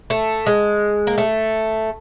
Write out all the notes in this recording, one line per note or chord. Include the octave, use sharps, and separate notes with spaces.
A3
G#3
A#3
A3